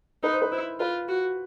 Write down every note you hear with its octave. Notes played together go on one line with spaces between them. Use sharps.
D#4 B4
C5
B4
E4 C5
F4 B4
F#4